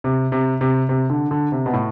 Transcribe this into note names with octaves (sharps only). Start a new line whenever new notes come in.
C3
C3
C3
C3
D3
D3
C3
B2
A2